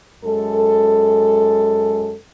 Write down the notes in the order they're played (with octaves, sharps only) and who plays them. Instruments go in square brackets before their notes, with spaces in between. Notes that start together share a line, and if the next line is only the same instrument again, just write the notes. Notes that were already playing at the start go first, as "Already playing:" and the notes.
[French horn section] F#2 G#3 A4